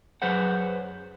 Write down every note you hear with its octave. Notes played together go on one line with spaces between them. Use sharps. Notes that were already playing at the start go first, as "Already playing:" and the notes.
F#2 F#3 G#4 B4 C5 F#5